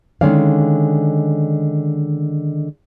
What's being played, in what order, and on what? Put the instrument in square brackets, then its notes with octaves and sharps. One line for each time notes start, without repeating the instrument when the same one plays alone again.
[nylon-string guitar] D3 D#3 G#3 C#4 D5 F5